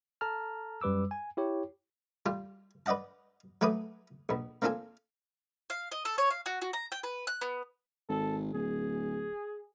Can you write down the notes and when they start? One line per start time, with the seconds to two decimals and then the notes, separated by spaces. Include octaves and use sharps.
0.21 A4 A5 A#5 F6
0.81 F#2 G3 B4 D6 E6
1.11 G#5
1.37 E4 G4 C#5
2.26 G3 F4 G4
2.86 B4 D5 D#5 F#5 A5
3.61 F#3 A3 B4 D6 D#6
4.29 A#1 B2
4.62 A#3 C4 D4 F4 A4 G#5
5.70 F5
5.92 D#5
6.05 A4
6.18 C#5
6.30 F5
6.46 F#4
6.62 F#4
6.73 A#5
6.92 G5
7.03 B4
7.27 F#6
7.41 B3
8.09 G#1 A4
8.54 D1 G#4